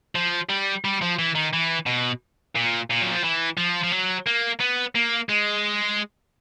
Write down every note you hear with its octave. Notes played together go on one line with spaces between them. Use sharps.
F3
G3
G3
F3
E3
D#3
E3
B2
A#2
A#2
F#3
F3
E3
F3
F3
F#3
A#3
B3
A#3
G#3